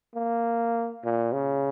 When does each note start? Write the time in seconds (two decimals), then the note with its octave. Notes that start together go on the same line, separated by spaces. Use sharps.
0.15 A#3
1.04 A#2
1.33 C#3